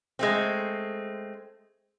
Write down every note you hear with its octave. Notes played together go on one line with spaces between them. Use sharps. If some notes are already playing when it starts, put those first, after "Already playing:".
G#3 A3 C4